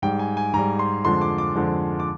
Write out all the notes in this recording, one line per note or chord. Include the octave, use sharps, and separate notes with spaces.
G#2 G3 G5
G#5
G#5
G#2 G3 A#5
C6
F2 D3 F3 G#3 C6
D6
D6
F2 D3 F3 G#3
D6